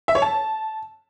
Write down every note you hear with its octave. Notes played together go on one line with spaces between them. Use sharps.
E5
C#5
A5